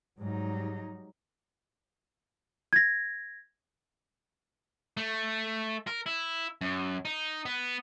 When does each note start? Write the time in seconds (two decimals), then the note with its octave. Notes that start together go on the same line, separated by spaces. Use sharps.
0.21 G#2 F#3 G3 D#4
2.73 G#6 A#6
4.97 A3
5.87 A#4
6.06 E4
6.61 F#2
7.05 D#4
7.45 B3